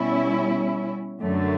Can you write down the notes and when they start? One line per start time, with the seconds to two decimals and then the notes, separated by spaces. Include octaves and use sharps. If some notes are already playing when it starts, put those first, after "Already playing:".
Already playing: B2 G3 C#4 E4
1.22 F#2 D3 A3